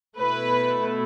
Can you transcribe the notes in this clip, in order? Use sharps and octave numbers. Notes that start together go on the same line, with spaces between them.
B2 A3 E4 B4